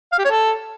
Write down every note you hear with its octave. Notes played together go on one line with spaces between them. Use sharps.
F5
G4
C#5
A4